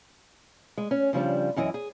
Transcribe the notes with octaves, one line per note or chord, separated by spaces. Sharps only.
G#3
C#4
C#3 F3 G3 D4
F#2 E3 E4 D#5
G#4